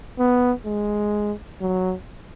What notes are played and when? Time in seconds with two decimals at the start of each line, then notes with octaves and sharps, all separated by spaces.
0.19 B3
0.66 G#3
1.61 F#3